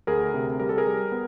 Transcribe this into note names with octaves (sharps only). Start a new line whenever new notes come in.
D2 G#4 A#4
C3
G3 A#4
A4
G#4 A#4
G3
B3